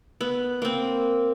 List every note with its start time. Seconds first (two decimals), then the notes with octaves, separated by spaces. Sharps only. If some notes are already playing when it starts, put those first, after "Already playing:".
0.21 B3
0.62 A#3 C4